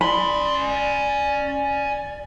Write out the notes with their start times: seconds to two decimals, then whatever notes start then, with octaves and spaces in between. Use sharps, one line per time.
0.01 C#4 D5 B5 C6